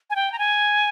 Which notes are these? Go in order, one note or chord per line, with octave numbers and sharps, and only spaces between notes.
G#5
G5
A#5
G#5